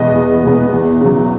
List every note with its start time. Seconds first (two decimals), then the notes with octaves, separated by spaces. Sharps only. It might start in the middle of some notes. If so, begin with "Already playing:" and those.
Already playing: E2 B2 G#3 B3 D#5
0.14 E2
0.43 B2 G#3 B3
0.72 E2
1.01 C#3 F#3